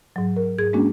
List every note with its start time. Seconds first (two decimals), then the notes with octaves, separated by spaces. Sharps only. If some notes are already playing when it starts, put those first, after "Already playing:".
0.16 G#2 F#3
0.37 A#4
0.58 G#2 G#4 G#6
0.73 G#3 A#3 C#4 D4 F#4